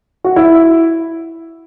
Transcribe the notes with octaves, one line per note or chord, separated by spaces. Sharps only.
F#4
E4